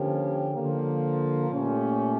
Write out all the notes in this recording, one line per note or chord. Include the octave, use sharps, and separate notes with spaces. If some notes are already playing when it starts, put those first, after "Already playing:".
Already playing: D3 F3 A#3 C#4 G4
D3 F3 A#3
A#2 A3 C#4 G4